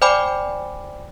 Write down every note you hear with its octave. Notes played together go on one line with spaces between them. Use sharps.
C5 D5 G5 G#5 B5 D6